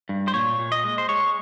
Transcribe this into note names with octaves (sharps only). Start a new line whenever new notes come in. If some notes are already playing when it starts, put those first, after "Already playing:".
G2
C5
A#2 C#5
A#2
D#5
G#3
C5
G#3 C#5